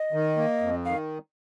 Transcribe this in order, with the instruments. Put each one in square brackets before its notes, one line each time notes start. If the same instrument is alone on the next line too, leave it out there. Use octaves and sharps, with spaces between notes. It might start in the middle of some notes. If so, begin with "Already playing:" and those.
Already playing: [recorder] D#5
[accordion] D#3
A#3
F2
[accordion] D#3 [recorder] F5